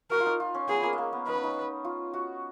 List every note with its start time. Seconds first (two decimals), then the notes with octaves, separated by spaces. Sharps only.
0.10 F#4 A#4
0.20 F4
0.26 D#4
0.40 F4
0.55 C#4
0.68 B3 G#4
0.83 A#3
0.93 G#3
0.98 A#3
1.13 B3
1.27 D#4 B4
1.35 C#4
1.44 D#4
1.85 F4
2.13 F#4